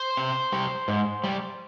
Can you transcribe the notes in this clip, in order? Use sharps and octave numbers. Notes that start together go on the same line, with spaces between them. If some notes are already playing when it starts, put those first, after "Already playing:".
Already playing: C5
C3
G3
G#2
G3